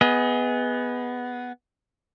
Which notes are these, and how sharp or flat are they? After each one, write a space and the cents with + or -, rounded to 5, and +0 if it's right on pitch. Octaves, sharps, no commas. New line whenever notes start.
B3 +0 G#4 -10 D#5 +30